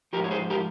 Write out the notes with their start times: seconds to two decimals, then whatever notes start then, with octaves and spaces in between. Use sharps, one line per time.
0.13 F3 G4 A#4
0.18 G#2
0.24 C#5
0.31 G#4 C5
0.50 G4 A#4